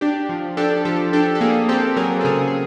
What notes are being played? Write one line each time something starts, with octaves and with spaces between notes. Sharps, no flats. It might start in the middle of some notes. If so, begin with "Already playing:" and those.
D4 G4
F3
D4 G4 A4
F3 G4 A4
D4 G4 A4
A4
A#3 G#4
C4 G4 A4
F#3 G#4 A#4
A4
C#3 G#4 A#4
G#4